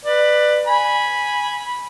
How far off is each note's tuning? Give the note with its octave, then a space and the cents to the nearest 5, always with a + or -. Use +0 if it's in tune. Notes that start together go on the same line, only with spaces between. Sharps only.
B4 +0 D5 +25
G#5 +0 B5 -10